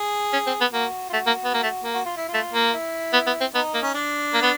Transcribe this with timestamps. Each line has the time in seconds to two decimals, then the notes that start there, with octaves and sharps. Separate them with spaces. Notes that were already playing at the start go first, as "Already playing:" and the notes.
Already playing: G#4
0.33 C#4
0.47 C4
0.60 B3
0.73 A#3 F#4
1.09 F4
1.13 A3 F#4
1.27 A#3
1.44 B3
1.54 A#3
1.63 A3
1.84 A#3
1.94 F#4
2.06 F4
2.17 E4
2.28 F4
2.34 A3
2.53 A#3
2.73 E4
3.13 B3
3.27 B3
3.40 C4
3.54 B3 D#4
3.74 A#3
3.83 C#4
3.95 D4
4.34 A#3
4.42 B3